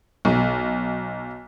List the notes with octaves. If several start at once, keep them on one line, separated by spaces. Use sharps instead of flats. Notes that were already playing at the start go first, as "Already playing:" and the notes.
B1